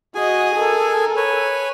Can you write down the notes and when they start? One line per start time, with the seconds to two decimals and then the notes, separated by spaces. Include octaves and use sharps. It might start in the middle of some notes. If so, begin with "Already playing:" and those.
0.15 F#4 G#4 D#5 G#5
0.55 A4 A#4
1.16 B4 C#5 G#5